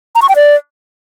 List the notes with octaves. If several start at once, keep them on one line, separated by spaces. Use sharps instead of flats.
A#5
C#6
G5
D5